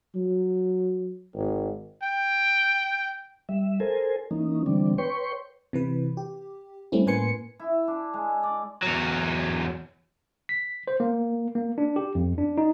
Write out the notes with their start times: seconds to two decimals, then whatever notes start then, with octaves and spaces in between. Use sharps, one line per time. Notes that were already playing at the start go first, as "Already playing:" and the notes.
0.15 F#3
1.34 G#1
2.03 G5
3.49 G3 E5
3.80 A4 A#4 C5 G#5
4.31 E3 A#3 C#4 D#4
4.66 D3 E3 G3 C4 D4
4.98 B4 C#5 G5 C6 C#6
5.73 C3 E3 B4
6.17 G4
6.92 G3 A3 C4 C#4 E4
7.06 A2 A#3 B4 G#5 C6 C#7
7.59 E4
7.88 D4
8.14 G#3
8.43 D5
8.83 E2 F#3
10.49 B6
10.88 C5
11.00 A#3
11.55 A#3
11.78 D4
11.96 G4
12.15 F2
12.38 D4
12.58 D#4